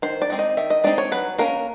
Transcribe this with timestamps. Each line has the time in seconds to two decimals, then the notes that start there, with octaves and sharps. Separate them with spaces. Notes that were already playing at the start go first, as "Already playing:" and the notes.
0.02 D#3 C5
0.22 D5
0.30 G#3 C4 D#4
0.39 D#5
0.57 D#3 E5
0.70 D#5
0.84 G#3 C4 D#4 D5
0.98 C#5
1.12 F#3 B4
1.38 A#3 C#4 A#4